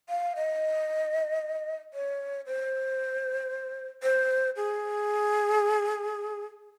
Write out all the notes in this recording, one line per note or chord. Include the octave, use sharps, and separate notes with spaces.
F5
D#5
C#5
C5
C5
G#4